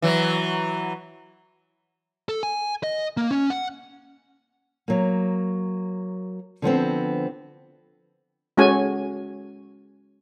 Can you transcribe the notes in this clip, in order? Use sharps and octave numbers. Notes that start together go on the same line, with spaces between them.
E3 F#3
A4
G#5
D#5
A#3
C#4
F#5
F#3 A#3
D3 F3 B3 C4
G#3 C#4 F#4 A4 C#5 G#5